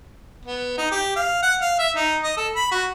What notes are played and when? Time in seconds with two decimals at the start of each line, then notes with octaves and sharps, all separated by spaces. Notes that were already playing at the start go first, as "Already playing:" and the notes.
0.45 B3
0.78 D#4
0.91 G4
1.16 F5
1.43 F#5
1.61 F5
1.79 E5
1.96 D#4
2.23 D#5
2.37 A4
2.56 B5
2.71 F#4